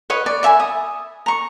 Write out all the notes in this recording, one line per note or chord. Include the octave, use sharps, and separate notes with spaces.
B4 C#5 D#5
D5
D5 E5 G#5 B5
D#6
A#5 C#6